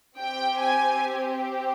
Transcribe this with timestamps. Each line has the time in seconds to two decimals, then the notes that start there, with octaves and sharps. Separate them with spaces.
0.18 C4 G4 G5
0.61 G#5